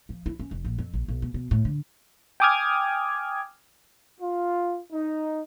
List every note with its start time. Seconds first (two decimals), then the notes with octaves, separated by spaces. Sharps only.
0.09 F3
0.26 E4
0.39 C#4
0.51 F1
0.64 A#1
0.78 F2
0.93 A#1
1.08 B1
1.22 B2
1.34 B2
1.51 A2
1.65 D3
2.40 G5 G#5 D6 D#6 F6 G#6
4.21 F4
4.92 D#4